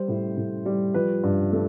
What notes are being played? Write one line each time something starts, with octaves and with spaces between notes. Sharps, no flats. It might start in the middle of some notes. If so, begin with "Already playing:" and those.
Already playing: G3 C5
A2
A2
G3
F3 B4
G2
A3